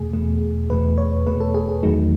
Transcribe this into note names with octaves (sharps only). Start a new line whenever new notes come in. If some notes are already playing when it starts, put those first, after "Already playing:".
Already playing: E2 B2 A3 G#4
E2 B2 A3
E2 B2 A3 B4
C#5
E2 B2 A3 B4
A4
G#4
G#4
E2 D#3 F#3 A3 D#4